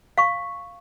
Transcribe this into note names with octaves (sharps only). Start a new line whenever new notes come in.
F5 C#6